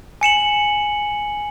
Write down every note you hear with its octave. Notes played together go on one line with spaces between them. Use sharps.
G#5 C#7 E7 F#7